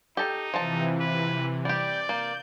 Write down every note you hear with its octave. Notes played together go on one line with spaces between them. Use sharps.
D#4 G4 A4
C3 E3 F3 A5
B4
G3 G4 D5 G6
A#3